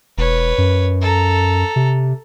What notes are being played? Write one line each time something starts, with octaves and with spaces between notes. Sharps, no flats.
E1 B4 C#5
F#2
A4 A#5
C3